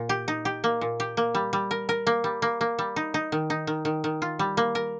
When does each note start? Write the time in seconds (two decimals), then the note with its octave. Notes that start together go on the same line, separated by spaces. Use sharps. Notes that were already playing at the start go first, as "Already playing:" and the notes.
Already playing: A#2
0.09 G4
0.28 D#4
0.45 G4
0.64 A#3
0.81 A#2
1.00 G4
1.17 A#3
1.35 G3
1.53 G3
1.71 A#4
1.89 A#4
2.07 A#3
2.24 G3
2.42 A#3
2.61 A#3
2.79 G3
2.96 D#4
3.14 D#4
3.32 D#3
3.50 D#4
3.67 D#3
3.85 D#3
4.04 D#3
4.22 F4
4.39 G3
4.57 A#3
4.75 A#4